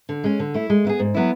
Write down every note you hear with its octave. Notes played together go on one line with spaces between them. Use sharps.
D3
G#3 C#4
D3
A3 E4
G#3
B3 E4 G#4
G#2
F#3 B3 E4